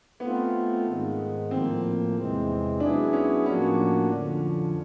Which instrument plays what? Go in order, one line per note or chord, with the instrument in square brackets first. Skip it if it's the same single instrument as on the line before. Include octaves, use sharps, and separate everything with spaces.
[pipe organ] A3 C4 F4 [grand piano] B3
[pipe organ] G#2 D#3 G#3
[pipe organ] A2 F3 A#3 [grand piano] C4
[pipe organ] E2 C3 E3 G#3 C4
[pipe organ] F#3 B3 E4 G#4 [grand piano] D4
[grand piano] C#4
[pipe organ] A2 F3 A#3 D4 F#4 [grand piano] C#4
[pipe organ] F2 D3 F3